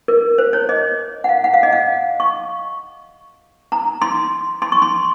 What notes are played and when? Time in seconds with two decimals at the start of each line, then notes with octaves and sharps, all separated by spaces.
0.08 A#4
0.38 C5
0.53 C#5
0.69 D#5
1.24 F#5
1.29 F5
1.44 F#5
1.54 F5
1.63 D#5
1.73 F5
2.20 C#6
3.72 A#5
4.02 C6
4.62 C6
4.72 C#6
4.82 C6